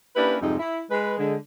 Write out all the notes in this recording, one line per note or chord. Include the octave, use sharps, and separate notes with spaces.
A#3 C#4 D4 E4 G4 B4
F2 G#2 C3 G3 C4 D#4
E4
G#3 B4
D3 G#3